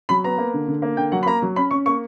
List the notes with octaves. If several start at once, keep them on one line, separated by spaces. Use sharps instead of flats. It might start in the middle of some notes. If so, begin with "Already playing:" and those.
F#3 B5
B3 A#5
A#3
D3
D3
A#3
D3 G5
F#3 F#5
B5
A#3 A#5
F#3
C#4 B5
C#4 C#6
A#3 C#6